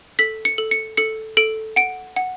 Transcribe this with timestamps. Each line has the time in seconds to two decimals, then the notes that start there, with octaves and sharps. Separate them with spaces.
0.19 A4 B6
0.45 C#7
0.58 A4
0.71 C#7
0.97 A4 C#7
1.37 A4 D7
1.76 F#5 D7
2.16 F#5